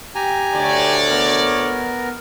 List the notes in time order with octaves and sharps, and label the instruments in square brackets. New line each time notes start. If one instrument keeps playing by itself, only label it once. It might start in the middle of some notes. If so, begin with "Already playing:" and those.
[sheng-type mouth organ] G4 G#5 A#5
[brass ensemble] D2 C#5 D5
[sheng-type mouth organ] B3 A#4